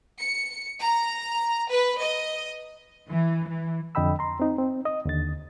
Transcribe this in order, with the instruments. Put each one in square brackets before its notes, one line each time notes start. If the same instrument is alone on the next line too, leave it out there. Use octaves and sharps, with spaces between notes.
[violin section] C#7
A#5
B4
D#5
[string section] E3
E3
[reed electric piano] F2 D3 D#5 G5 B5 E6
A#5 C6
C4 D#4
C4
D#5 D#6
D#2 D3 A6